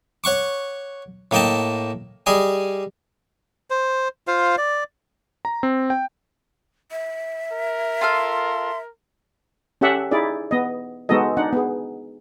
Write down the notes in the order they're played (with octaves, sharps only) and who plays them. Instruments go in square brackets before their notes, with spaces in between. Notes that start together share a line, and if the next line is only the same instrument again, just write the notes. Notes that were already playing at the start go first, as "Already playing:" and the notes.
[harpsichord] C#5 F#5 C#6 D6
A2 A#3 D#5 G5 A5
G3 G#4 D#5 G#5
[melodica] C5
F4 C5 F5
D5
[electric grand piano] A#5
C4
G5
[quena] E5
[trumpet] A#4
[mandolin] F4 A4 F5 [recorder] C6
[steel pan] C#4 G4 A4 E5 F#5
D#4 E4 G#4 D5
B3 D#5
G#3 B3 D#4 F#4 A4 D#5
D4 D#4 F#5
B3 G#4